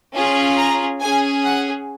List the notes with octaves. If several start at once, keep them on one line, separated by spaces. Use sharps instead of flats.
C#4 F4 G#4
A#5
C#4 G#4 G#5
F#5